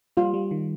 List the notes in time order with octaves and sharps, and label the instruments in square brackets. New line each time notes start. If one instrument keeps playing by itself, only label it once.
[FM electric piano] G3 [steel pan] F4
[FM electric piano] G3
D#3